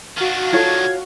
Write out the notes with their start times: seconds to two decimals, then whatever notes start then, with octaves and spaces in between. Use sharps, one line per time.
0.17 D#3 D4 F#4 F5
0.53 F4 A4 C#5 G#6